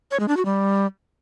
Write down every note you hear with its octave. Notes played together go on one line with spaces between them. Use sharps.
C#5
G#3
D4
F#4
G3